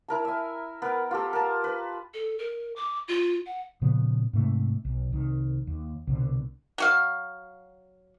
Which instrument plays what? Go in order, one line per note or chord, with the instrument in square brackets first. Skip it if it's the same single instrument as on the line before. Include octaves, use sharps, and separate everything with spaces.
[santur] E4 A#4 A5
E5 G#5
B3 A#4
F4 G4 A4
A#4 A5
B4
[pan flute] A4
A#4
D6
F4
F#5
[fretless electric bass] A#2 C#3 F3 B3
G#2 C3 A3
B1
C2 D#3
D#2
C2 B2 D3
[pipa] F#3 F#4 F5